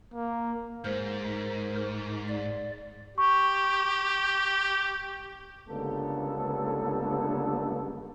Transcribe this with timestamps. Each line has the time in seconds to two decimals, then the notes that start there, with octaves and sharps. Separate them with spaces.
0.14 A#3
0.85 G#2 A#4 C5
2.29 D5
3.18 G4 C#6
5.68 C#2 G2 D3 A#3 B3 A4